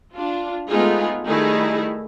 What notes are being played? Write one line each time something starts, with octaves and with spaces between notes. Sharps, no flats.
D4 F4
G#3 A3 B3 D#4 F4 G#4
D#3 G3 A3 D#4 E4 G#4